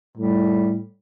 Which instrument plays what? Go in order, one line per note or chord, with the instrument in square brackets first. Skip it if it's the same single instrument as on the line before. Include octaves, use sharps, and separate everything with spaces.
[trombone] A2 [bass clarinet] G3